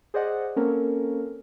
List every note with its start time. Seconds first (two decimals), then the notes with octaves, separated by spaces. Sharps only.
0.14 G#4 C5 D5 D#5 F#5
0.56 A#3 C4 C#4 A4 A#4